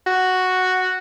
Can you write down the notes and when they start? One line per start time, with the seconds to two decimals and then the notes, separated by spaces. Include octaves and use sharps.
0.06 F#4